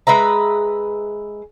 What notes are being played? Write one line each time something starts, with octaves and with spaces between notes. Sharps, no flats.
G#3 B4 E5 A#5